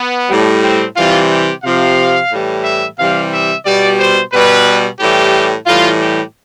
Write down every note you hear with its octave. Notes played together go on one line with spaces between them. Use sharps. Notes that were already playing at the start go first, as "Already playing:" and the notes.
Already playing: B3
A2 G3
C4
C3 E3 G3 F4
G4
C3 F3 F5
A2 E3 G3
E5
C3 E3 G3 F5
E5
B2 G3 D5
C5
B2 G3 B4
A2 E3 G3 G4
A2 E3 G3 F4
G4